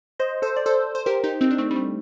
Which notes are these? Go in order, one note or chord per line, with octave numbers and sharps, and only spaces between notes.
C5 D#5
A4 C5
D5
A4 C5
C5
G4 A#4
D#4 G4
C4 D#4
D4
A3 C4
G3
A3